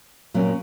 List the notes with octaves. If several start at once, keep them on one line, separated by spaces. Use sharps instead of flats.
A#2 F#3 A#3 C#4